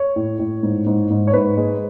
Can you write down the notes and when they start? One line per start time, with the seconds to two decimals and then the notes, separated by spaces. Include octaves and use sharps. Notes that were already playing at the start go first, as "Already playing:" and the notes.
Already playing: C#5
0.16 A2
0.39 A2
0.63 G#2
0.86 G#2
1.10 G#2
1.27 C#5
1.33 G#2 B4
1.57 G#3